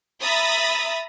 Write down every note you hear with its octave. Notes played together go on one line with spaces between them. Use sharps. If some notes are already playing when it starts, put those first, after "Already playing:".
E5 A#5 B5 D#6 A6 A#6